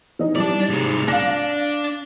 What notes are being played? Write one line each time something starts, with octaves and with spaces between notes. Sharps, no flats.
E3 D#4
G3 E4 D5 A5
G#2 C3
D4 F5 A#6